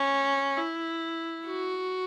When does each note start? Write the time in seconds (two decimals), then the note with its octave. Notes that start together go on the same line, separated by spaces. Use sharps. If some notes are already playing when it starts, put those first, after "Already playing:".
Already playing: C#4
0.57 E4
1.47 F#4